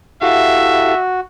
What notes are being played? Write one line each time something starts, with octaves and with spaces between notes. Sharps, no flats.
E4 F#4 G4 A4 E5 F5